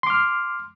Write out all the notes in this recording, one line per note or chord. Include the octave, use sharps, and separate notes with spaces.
C6 D6 F6